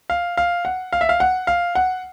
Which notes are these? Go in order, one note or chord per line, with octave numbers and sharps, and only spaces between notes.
F5
F5
F#5
F5
E5
F5
F#5
F5
F#5